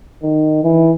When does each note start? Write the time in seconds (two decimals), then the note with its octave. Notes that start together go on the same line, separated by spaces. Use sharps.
0.23 D#3
0.63 E3